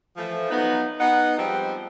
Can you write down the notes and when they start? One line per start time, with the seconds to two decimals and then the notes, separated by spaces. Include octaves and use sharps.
0.17 E3 F3 A3
0.50 F#3 B3 D#4
1.00 B3 D#4 F#5
1.38 F3 G3 G#3 C4 D#4 F4